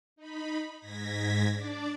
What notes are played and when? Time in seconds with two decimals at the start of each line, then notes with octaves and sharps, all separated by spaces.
0.16 D#4 B5
0.78 G#2 G#6 A#6 B6
1.53 D4 D5 D6